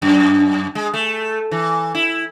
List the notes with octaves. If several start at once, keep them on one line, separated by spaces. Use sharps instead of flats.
F#2
G#3
A3
E3
E4